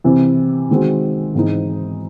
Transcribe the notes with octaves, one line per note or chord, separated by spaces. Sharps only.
C3 E3 C4
D#3 G#3 C4 F#4
G#2 E3 C4 D#4